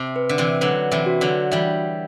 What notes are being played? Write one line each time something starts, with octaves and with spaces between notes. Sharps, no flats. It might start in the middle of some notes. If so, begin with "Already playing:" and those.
Already playing: C3 E5 A5
B4
D3
C3 E3
D3 F#3 B4
C3 E3
F#4
D3 F#3
E3 G3 E5